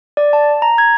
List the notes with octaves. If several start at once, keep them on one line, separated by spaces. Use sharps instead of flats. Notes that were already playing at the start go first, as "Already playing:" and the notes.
D5
A5
A#5
G#6